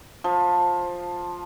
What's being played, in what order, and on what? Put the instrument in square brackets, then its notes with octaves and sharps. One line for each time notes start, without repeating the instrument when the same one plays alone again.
[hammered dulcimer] F3